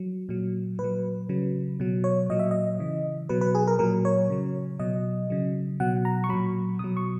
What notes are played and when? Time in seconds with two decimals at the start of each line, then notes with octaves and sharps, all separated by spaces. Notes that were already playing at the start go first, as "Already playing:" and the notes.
Already playing: F#3
0.29 A#2 F#3
0.79 A#2 B4
0.84 F#3
1.29 C#3 F#3
1.80 B2 F#3
2.04 C#5
2.30 A#2 F#3 D#5
2.39 E5
2.51 D#5
2.80 C#3 E3
3.29 B2 F#3 B4
3.41 B4
3.55 G#4
3.68 A#4
3.79 A#2 F#3 A#4
4.05 C#5
4.30 C#3 F#3
4.79 B2 F#3 D#5
5.30 C#3 F#3
5.80 B2 F#3 F#5
6.05 A#5
6.24 C#6
6.29 A#2 F#3 B5
6.79 B2 F#3 D#6
6.97 C#6